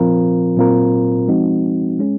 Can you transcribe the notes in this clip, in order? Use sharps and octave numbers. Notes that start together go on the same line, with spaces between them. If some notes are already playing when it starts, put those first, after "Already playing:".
Already playing: A#2 F3 C4 F4 A#4
A#2 F#3 C4 F4 A#4
F3 G#3 C4 D#4 F#4
G#3 C#4 G#4